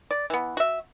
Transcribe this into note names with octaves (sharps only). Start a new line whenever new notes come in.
D5
E3 B3
F#4 E5